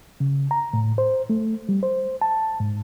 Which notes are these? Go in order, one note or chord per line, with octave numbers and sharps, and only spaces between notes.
C#3
A#5
A2
C5
A3
G3
C5
A5
G#2